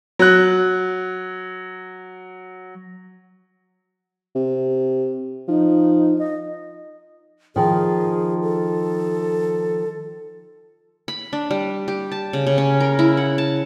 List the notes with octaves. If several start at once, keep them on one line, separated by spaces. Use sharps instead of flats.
F#3 F#6
C3
F3 D#4
D#5
D#3 F3 G#4
A4
B5
D4
G3
G4
A5
C#3
C#3
C#4
A#4
E4
F#5
A5